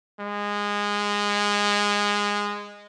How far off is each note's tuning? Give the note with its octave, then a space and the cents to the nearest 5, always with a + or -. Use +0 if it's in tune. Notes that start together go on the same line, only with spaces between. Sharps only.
G#3 -15